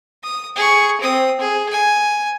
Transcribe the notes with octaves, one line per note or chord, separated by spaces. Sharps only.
D#6
G#4 C#6
C4 D#6
G#4
G#5